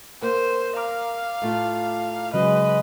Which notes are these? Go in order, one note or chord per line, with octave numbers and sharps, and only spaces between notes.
A#3 C5
F5 A#5 D6 F6
A2 A3 F4
C#3 F#3 G#3 B4 D#5